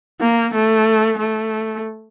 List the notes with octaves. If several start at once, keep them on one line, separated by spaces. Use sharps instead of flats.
A#3
A3
A3